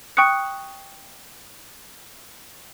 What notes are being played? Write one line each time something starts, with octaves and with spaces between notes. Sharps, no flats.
G5 C#6 D#6 F#6 C#7